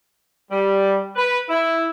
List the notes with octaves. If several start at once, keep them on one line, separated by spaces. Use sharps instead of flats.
G3
B4
E4